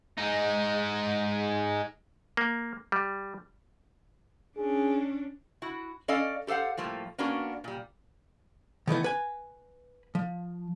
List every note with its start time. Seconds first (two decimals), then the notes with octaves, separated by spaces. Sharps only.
0.18 G#3 D#4
2.37 A#3
2.92 G3
4.58 C#4 D4 G#4
5.62 E4 F#4
6.08 C#4 A4 D5 D#5 F5
6.47 G4 A4 C5 F5 F#5
6.77 A2 F3 G3 A3 A#3
7.18 A#3 B3 C#4 D4 F#4 A#4
7.64 A#2 G3
8.87 D#3 E3 A3 B3
9.04 B4 G#5
10.15 F3